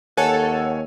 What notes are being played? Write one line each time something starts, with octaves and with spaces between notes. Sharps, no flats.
D#2 A4 C#5 F#5 G#5